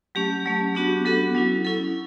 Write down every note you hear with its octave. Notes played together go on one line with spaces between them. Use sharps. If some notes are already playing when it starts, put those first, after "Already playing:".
F#3 A3 C#4 G4
F#3 A3 C#4
F#3 B3 D4 F#4 G4
F#3 B3 D4 F#4 A4
F#3 C#4 E4
F#3 C#4 E4 A4